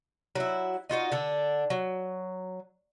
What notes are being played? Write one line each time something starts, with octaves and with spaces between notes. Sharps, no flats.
F#3 E4
D#4 F4 F#4 D#5
D3 D4 A4
F#3